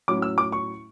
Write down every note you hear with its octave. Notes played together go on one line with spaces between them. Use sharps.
A2 F#3 C#4 E4 D6
E6
D6
C#6